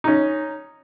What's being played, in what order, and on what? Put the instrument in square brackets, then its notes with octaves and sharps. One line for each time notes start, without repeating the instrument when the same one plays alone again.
[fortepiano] C#4 D#4